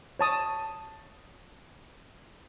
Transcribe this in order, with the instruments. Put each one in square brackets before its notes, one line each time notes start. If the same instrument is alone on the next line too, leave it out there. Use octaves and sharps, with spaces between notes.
[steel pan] C#5 A5 D#6